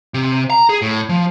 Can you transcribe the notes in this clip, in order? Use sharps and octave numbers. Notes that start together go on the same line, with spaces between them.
C3
A#5
G#4
A2
F3